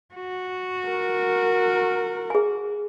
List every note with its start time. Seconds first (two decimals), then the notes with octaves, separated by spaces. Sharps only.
0.15 F#4
0.87 A#4
2.30 G#4 G#5